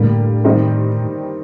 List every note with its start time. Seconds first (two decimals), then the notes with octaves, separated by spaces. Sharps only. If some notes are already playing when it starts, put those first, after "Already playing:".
Already playing: A2 D3 G3 A#3
0.44 D#3 G3 C4 D#4